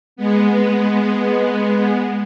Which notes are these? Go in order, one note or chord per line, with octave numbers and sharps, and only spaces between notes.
G#3 B3